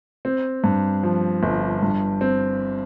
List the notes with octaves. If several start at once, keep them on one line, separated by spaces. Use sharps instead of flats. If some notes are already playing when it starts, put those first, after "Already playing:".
C4
G2
F3
G1
G2
C4